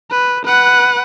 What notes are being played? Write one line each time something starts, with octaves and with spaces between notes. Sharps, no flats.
B4
B4 F#5